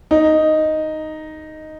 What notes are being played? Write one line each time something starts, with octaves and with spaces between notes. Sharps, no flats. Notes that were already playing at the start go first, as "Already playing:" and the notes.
D#4